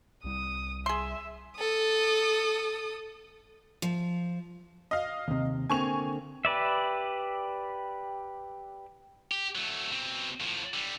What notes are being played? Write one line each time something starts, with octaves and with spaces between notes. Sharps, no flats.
C2 G3 D#6
G#4 E5 C6
A4 D#6
F3
D#5 F5
D#2 C3
D3 A#3 C4 G#5 C#6 F7
G4 B4 D5 E5
G4
F#3 A3
B2 C4
A2 F3
D3 G3